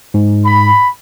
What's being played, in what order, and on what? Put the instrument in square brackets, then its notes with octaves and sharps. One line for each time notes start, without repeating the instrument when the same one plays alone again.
[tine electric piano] G#2
[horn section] B5